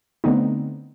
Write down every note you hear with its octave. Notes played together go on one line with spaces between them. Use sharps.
D3 A3 B3 C4 D#4